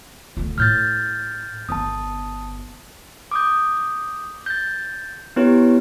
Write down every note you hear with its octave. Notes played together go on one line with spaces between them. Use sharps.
D2 F4
A2 F6 G6 A6
G1 B3 A5 D#6
D6 D#6 G6
G6 A6
B3 E4 G4 B4 C#5